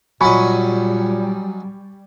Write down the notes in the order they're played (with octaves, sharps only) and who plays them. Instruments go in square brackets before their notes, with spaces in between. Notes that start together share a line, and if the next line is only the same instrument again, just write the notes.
[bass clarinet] A#2 [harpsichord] F#3 C#4 D#4 [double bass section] G3 [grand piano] G#5 B5 C#6